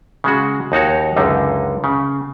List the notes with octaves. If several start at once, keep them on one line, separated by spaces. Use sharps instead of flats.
C#3 G#3 F#4
D#2 D#4 F#4 C#5
C#2 F#2 D3 D#4
C#3